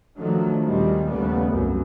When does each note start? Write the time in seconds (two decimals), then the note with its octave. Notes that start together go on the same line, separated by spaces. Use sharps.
0.18 D3 D#3 F3 F#3 A3
0.64 D#2 A#2 D#3 G3 G#3 C4
1.08 D#2 C#3 G3 A3 B3
1.48 C2 F#2 C#3